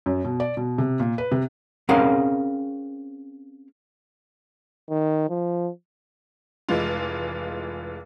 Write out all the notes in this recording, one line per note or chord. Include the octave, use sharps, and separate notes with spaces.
F#2
B2
D5
B2
C3
A#2
B4
C3
C4 C#4 G#4 A#4 F5 F#5
D#3
F3
F1 E3 G#3 F4